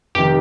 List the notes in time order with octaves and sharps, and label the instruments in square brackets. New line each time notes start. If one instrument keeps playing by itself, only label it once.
[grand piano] F1 D#3 [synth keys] G4